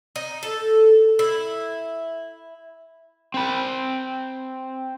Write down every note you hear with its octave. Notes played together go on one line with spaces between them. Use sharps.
D#4
A4
E4
C4 B5